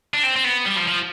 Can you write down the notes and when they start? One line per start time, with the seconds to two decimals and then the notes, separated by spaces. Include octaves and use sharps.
0.14 D4
0.23 C4
0.36 C4
0.45 B3
0.66 G3
0.77 F3
0.88 F3